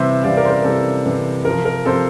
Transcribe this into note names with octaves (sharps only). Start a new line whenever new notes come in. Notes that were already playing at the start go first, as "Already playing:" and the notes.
Already playing: C3 E3 G3 C5 E5
C3 E3 G3 D5 F5
A#4 D5
C5
A#4
C3 E3 G3 A4
C3 E3 G3
C3 F3 A#4
A#4
C3 F3 A4 C5